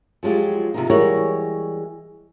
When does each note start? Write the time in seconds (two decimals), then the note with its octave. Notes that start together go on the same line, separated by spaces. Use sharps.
0.23 F3 F#3 G#3 F4 G4
0.74 C3 F3 D#4
0.90 E3 G3 G#3 F#4 A#4 C#5